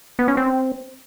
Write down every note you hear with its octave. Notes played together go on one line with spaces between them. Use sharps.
B3
C#4
C4